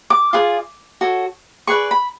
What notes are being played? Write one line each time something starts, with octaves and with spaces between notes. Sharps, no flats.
D6
F4 G#4 B4 D5
F#4 A4 C#5
G#4 B4 D5 C#6
B5